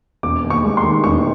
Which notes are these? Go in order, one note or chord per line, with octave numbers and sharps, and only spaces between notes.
E1 D6
D#2
C#6
G#3
C6
D#3
E1 C#6